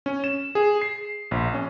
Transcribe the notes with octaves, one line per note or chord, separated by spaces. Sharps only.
C#4
E7
G#4
C7
A#1
C#4